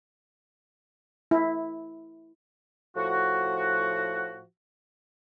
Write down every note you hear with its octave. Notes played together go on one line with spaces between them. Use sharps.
E4
A2 F3 F#4